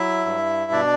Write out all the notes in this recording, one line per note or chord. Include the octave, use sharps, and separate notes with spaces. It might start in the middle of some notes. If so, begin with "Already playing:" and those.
Already playing: F#3 E4 E5
G2
B2 D4 D5